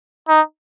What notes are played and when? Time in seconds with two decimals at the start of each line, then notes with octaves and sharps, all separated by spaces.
0.29 D#4